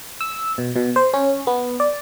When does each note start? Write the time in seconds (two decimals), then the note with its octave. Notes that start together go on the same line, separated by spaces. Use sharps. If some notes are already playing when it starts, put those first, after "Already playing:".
0.21 E6
0.58 B2
0.76 B2
0.96 C5
1.13 C#4
1.47 B3
1.80 D5